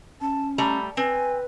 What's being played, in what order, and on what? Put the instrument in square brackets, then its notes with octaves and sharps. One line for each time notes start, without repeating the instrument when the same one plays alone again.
[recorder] C#4 [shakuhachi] A5
[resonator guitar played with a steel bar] G3 A3 A#5 [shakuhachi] B5
[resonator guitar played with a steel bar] C4 [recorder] B4 [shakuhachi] G#5